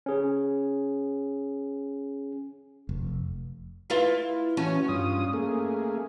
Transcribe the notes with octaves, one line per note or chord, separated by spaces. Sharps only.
C#4 G#4
F1
E4 F4 B4
E3 C#4 F#4 C#5
G2 F4 D#6
A3 A#3 G#4